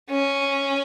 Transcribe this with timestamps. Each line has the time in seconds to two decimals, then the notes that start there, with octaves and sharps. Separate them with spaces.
0.10 C#4